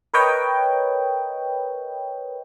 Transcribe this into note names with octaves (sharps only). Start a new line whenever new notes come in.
A#4 B4 C#5 D#5 G5